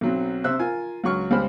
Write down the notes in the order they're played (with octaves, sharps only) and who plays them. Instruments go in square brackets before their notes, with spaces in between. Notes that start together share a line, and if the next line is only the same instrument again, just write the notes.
[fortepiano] B1 F#3 C4
C3 C5 E5 E6 F#6
F4 A#4 G#5
C#2 F#3 C#6 F6
C#2 G3 C5 B5 F6